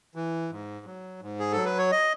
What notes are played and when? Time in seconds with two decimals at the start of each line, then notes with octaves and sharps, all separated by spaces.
0.15 E3
0.50 G#2
0.85 F#3
1.22 G#2
1.39 G#4
1.52 F#3 A4
1.65 B4
1.78 C#5
1.92 D#5